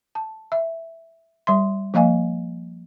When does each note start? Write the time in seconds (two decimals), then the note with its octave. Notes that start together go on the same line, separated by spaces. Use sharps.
0.15 A5
0.52 E5
1.47 G3 E5 C6
1.94 F3 A#3 D#5 F5 G#5